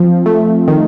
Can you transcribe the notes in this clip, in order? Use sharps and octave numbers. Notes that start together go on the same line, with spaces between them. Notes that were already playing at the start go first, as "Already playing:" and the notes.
Already playing: F3 C4
A3
D#3